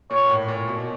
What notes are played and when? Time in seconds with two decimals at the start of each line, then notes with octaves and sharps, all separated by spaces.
0.11 A#2 C#5
0.29 A2
0.48 A#2
0.68 B2